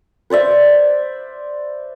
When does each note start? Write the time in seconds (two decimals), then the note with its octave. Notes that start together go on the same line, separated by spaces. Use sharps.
0.30 B4 C5 D5 E5